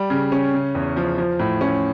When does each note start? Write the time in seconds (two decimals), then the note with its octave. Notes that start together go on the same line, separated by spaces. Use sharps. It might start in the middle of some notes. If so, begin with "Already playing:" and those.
Already playing: G3
0.10 C#3
0.32 C#4
0.53 C#3
0.75 E2
0.96 F3
1.18 F3
1.39 A2
1.61 C#4